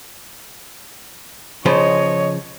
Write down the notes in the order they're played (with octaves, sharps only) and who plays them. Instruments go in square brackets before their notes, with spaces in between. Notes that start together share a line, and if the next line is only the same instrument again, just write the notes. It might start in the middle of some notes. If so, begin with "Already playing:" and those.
[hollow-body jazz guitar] C#3 F3 C5 [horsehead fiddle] C#5 D#5